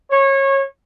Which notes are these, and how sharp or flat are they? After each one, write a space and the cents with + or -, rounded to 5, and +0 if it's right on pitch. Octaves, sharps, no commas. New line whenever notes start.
C#5 -25